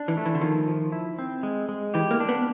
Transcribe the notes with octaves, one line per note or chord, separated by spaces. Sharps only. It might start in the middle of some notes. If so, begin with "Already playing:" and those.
Already playing: D4
E3
A3
E3
D3
D#3 F3
F3
E4
C4
G#3
G#3
E3 G4
A#3
D4
B3